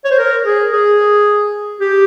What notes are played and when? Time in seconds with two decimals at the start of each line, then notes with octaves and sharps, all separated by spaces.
0.05 C#5
0.11 C5
0.19 A#4
0.46 G#4
0.73 G#4
1.81 G4